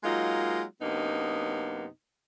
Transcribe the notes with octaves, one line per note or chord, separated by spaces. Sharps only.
F#3 G#3 A#3 D#4 F4
F#2 C3 A#3 B3 D4 D#4